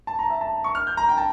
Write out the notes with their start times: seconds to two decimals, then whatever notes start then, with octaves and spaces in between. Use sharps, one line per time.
0.07 A5
0.19 A#5
0.30 E5
0.41 A5
0.64 C#6
0.75 F6
0.87 G6
0.97 A#5
1.09 G5
1.17 A5